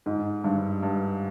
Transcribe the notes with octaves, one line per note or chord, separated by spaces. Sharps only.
G#2
G2
G2